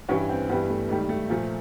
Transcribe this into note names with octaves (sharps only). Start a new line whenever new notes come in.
G2 E3 G3 C#4
C4
G2 E3 G3 B3
A3
G#2 D#3 G3 A3
A3
A#2 F3 A3 A#3